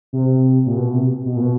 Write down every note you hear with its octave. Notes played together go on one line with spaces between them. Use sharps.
C3
A#2
B2
C3
B2
A#2
B2